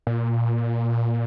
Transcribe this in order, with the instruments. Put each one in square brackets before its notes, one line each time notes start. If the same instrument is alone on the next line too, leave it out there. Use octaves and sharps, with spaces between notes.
[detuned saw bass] A#2